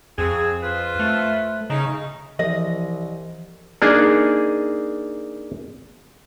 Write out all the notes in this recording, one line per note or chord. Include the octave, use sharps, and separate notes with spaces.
F2 C4 G#4
F4 B4 C5
A3
C#3 D#4
C2 E3 F3 D#5
A#3 D4 D#4 G#4